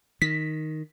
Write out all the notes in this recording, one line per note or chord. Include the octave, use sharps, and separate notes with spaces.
D#3 B6